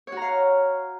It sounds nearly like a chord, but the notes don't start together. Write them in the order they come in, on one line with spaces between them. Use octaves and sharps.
C#5 F#4 A#5 F5